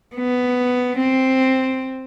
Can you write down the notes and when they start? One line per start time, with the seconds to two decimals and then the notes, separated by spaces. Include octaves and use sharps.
0.16 B3
0.98 C4